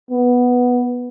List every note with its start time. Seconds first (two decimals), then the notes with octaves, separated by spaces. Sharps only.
0.11 B3